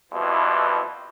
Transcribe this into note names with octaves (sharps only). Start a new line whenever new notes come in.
F2 B2 E3 G3 E4